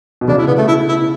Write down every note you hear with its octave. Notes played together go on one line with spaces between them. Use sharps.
B2
C#3 D4
E4
B3
A3
E4
E4